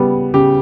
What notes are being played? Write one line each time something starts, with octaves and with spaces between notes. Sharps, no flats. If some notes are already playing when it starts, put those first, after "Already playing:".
Already playing: C#3 G3 B3
C#3 G4